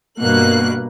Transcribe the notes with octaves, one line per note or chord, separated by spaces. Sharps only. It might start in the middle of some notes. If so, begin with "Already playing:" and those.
G2 B2 A#3 F#6